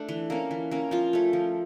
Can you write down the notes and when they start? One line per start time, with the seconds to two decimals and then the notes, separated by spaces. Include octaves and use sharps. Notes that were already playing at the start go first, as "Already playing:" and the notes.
Already playing: A3 D4
0.09 E3
0.30 A#3 C#4
0.51 E3
0.71 A#3 C#4
0.91 F3 F4
1.13 A3 C#4
1.33 F3